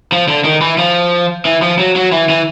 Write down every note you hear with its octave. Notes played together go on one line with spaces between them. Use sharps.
F3
D3
D#3
E3
F3
E3
F3
F#3
F#3
E3
E3